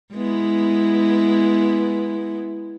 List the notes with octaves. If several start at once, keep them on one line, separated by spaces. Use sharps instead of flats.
G#3 B3 E4